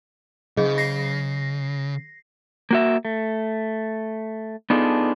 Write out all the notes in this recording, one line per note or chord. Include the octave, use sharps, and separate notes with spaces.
C#3 F#3 G#4 D#5
A#6 C7
A#3 F#4 E5
A3
B3 D4 D#4 F4 G#4 A4